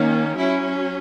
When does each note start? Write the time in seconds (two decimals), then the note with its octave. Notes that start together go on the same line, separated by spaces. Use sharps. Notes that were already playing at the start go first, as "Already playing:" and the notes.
Already playing: D#3 A#3 C#4
0.36 F#3 C#4 E4